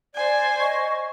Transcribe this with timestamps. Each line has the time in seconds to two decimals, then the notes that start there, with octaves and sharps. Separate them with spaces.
0.15 C5 D5 G#5
0.60 D#5 C#6